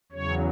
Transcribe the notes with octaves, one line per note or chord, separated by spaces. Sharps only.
E2 C#3 F#3 C#5